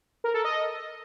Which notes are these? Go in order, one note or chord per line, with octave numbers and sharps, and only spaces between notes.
A#4
A4
D#5